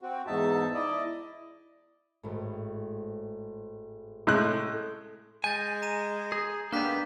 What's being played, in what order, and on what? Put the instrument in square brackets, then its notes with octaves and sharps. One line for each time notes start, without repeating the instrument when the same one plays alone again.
[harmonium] C4 F#4
E2 G#2 D#4 E5 A5
E4 D5 D#5
[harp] G#1 A2
[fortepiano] A2 G#3 F#6 [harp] C#4 A4
[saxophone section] G#3 [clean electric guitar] G#5 [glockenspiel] G6 A6
[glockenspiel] A#5 D#7 E7
[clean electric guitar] G#4
[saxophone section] G#2 G4 F5 [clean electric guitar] A#3 B3 [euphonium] D4 [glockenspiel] F#6 B6